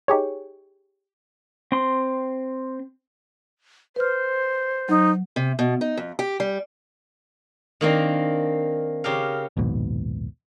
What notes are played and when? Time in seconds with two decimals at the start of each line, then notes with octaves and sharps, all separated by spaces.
0.08 D#4 G4 G#4 C#5
1.72 C4 C6
3.96 B4 C5 F6
4.89 F#3 D#4
5.36 C3
5.59 B2
5.81 D#4
5.97 F2
6.19 G4
6.40 G3
7.81 D#3 A#3 C4 D4
9.04 C#3 G4 A#4 F5
9.57 A#1 D#2 G#2 B2